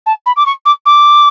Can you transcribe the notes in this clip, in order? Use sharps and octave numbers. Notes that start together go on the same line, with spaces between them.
A5
B5
D6
C#6
D6
D6